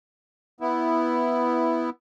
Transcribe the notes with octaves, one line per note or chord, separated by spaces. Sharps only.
B3 E4